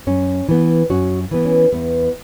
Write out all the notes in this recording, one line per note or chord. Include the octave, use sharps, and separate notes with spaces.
F#2 C#4
E3 B3
F#2 C#4 F#4
E3 B3
C#4
E2 B3